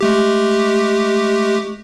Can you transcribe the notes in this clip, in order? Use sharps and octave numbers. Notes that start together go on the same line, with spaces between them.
G#3 A3 G4